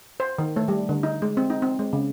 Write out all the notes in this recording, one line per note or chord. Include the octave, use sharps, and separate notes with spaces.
C5
D#3
A3
G3
D3
D#4
G#3
C4
D#4
C4
G#3
C#3